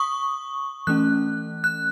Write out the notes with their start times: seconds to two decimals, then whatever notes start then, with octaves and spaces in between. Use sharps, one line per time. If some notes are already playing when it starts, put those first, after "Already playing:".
Already playing: C#6 D#6
0.87 E3 A3 C#4 F#6
1.64 F#6